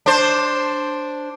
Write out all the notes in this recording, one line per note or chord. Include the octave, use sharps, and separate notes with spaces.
D4 C5